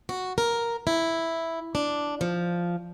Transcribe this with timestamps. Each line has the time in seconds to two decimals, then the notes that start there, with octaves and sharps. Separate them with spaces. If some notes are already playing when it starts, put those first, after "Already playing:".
0.09 F#4
0.38 A#4
0.87 E4
1.75 D4
2.21 F3